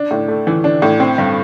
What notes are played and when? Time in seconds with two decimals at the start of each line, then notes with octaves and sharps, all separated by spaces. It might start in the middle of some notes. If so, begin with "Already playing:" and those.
Already playing: D4
0.11 A2
0.28 A3
0.47 E3
0.64 D4
0.82 A2
1.00 C4
1.18 G2